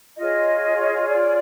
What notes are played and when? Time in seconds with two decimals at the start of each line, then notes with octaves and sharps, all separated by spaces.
0.17 F4 G#4 C#5 D#5
1.08 D5